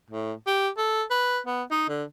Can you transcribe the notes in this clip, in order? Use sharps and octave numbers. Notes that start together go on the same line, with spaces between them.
A2
G4
A4
B4
B3
D#4
D3